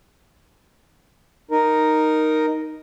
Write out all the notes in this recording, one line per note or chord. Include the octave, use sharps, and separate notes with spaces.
D#4 A#4